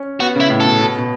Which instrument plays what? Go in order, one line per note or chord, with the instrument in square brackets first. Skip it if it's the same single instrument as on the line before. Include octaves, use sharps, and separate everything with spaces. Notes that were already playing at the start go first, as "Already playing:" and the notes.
Already playing: [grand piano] C#4
[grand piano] B3 [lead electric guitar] F#4
[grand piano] C#3
[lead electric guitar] E4
[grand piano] A2
[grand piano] B2 [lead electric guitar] A4
[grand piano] B2
B2